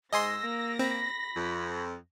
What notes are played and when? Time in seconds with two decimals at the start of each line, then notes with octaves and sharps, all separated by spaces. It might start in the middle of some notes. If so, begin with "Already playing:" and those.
0.13 G#2 D#5 G#5 C6 E6 A#6
0.43 A#3
0.79 C4 B5
1.36 F2